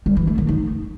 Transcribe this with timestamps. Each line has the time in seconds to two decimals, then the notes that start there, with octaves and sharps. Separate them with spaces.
0.06 G3
0.17 E3
0.27 A3
0.38 D#3
0.49 D#4